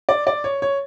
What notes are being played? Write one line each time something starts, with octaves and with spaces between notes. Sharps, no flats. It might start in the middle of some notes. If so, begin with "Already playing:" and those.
D5
D5
C#5
C#5